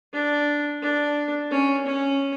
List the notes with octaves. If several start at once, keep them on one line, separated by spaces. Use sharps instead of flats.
D4
D4
C#4
C#4